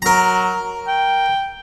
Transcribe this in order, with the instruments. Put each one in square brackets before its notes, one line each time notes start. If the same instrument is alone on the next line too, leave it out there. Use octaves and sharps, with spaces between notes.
[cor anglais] F#3 [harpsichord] A#4 A#5
[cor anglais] G5